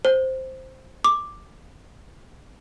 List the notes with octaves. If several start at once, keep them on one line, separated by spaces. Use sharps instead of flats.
C5
D6